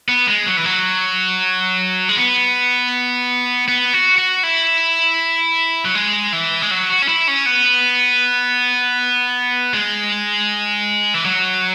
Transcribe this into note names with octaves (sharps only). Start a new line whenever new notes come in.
B3
G#3
F#3
E3
F#3
G#3
B3
B3
F#4
F#4
E4
F#3
G#3
E3
G#3
F#3
F#4
C#4
E4
C#4
B3
G#3
E3
F#3